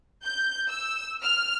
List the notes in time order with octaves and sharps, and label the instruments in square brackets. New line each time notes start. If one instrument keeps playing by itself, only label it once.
[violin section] G6
E6
F6